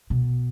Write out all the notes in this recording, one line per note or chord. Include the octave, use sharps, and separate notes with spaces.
B2